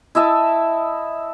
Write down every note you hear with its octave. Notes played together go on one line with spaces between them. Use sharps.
E4 D#5 E5 A5